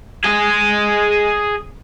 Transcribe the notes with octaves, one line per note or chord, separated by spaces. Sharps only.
G#4 D#5